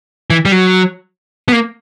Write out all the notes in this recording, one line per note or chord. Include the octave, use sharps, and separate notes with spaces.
E3
G3
F#3
B3
A#3